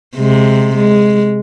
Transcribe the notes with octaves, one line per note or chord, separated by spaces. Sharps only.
C3 G#3
G#3